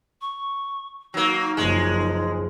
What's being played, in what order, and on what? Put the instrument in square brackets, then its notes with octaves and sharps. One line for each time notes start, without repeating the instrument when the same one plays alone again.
[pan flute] C#6
[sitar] F#3 A#3 [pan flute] D#4
[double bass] F#1 F3 [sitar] G#3